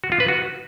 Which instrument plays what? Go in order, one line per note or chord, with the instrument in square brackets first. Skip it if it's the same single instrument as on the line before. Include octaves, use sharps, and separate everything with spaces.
[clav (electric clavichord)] F#4
F4
B4
F#4